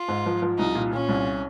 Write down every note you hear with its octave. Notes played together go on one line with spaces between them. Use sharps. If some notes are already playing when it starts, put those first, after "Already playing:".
Already playing: F4
G#2
F3
F3
C2 D#4
A#2
A#2 C#4
C2